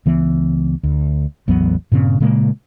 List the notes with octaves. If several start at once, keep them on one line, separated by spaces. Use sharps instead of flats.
C#2 E3 B3
D2
A1 E2 F#3 B3
G2 A#2 C#3 C4
A#2 C#3 G#3 A#3